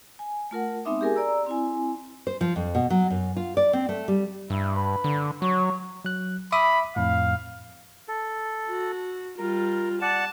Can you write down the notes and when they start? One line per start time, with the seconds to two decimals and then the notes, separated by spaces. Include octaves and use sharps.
0.19 G#5
0.51 A3 F4 A#4 F#5
0.85 G#3 B3 C4 D#4 E5 D6
1.01 G4 G#4 A#4 G#5
1.16 D5 A#5 E6
1.47 C4 E4 G#5
2.27 C5
2.41 F3
2.56 F2
2.75 B2
2.90 F#3
3.10 F#2
3.37 F4
3.57 D5
3.73 C4
3.89 A3
4.08 G3
4.50 G2 E4
4.76 B4
5.04 D3
5.42 F#3 C#5
6.05 F#3 F#6
6.52 E5 B5 D6 D#6
6.96 F2 A2 F5
8.08 A4
8.69 F#4
9.38 G3 F4 A#4
10.01 D5 F#5 A5